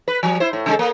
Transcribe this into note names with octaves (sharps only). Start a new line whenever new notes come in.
B4
F3 G3
E4 C5
A2
C#3 G#3 A4
A#3